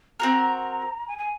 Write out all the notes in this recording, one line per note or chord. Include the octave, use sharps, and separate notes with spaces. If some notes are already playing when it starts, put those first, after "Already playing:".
C4 F#4 A#4 A#5
G#5
G#5